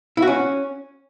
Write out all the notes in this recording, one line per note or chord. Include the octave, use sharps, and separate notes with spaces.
E4
F#4
C#4